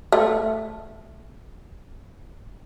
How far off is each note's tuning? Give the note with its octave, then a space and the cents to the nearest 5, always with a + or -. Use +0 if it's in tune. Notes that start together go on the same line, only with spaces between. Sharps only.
A3 +0